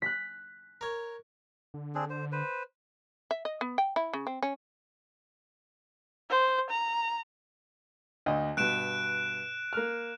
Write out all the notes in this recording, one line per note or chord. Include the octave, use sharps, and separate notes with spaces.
F#6 B6
A#4 C#5
D3
C4 D4 G#4
C5
B4 C5
E5
D#5
B3
G5
E4
C#3
C4
C#4
C5
A#5
D2 D3 D#5
G2 B2 F#6 D7 E7
A#3 F6